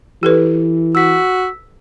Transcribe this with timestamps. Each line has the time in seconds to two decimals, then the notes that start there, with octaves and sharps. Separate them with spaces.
0.23 E3 G4 A4 B4
0.95 F#4 E6 B6